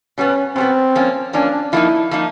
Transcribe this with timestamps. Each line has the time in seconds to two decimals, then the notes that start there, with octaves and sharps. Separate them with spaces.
0.18 B2 G3 B3 C#4
0.56 B2 G3 B3 C4
0.95 F3 A#3 C#4
1.33 F3 A#3 C#4 D4
1.73 F3 A#3 D#4 E4
2.11 F3 A#3 D#4